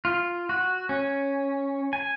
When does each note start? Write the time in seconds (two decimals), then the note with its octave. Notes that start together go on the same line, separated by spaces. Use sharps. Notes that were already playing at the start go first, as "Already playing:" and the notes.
0.05 F4
0.49 F#4
0.89 C#4
1.93 G#5